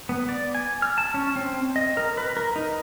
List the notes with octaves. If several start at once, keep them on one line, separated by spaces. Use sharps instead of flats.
B3
D5
G#5
F6
A5
C#4
C4
D#5
A#4
B4
A#4
D#4